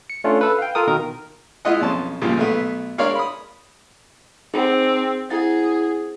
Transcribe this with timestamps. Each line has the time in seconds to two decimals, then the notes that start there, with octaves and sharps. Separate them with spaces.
0.10 C#7
0.24 A3 C#4 D4 F4
0.41 A4 B4
0.59 F5 G5
0.75 F4 A4 A#4 D#6
0.87 B2 D#3 A#4
1.65 G#3 E4 F4 D#5 F#5
1.80 B1 F2 C#4 A5 C6
2.22 C#2 G2 A#2 C#3 F3
2.37 B1 A3 B3
2.98 G#3 D4 A#4 C#5 D5 F5
3.15 B5 D#6
4.54 C4 D#4 G#4
5.30 E4 G#4 F#5 A6